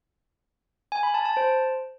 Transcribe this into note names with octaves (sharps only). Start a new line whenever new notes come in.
G#5
B5
A5
A5
C5